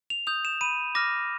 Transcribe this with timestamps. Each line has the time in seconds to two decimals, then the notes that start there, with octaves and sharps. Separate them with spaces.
0.10 F7
0.27 D#6 G6 F7
0.45 E7
0.61 B5 D#7
0.95 D6 F6 A#6